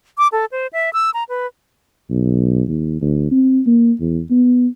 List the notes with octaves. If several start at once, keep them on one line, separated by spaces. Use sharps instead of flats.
D6
A4
C5
E5
E6
A#5
B4
B1
D#2
D2
C4
A#3
E2
B3